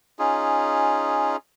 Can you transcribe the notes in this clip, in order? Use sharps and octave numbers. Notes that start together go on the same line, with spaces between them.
C#4 D#4 F4 G#4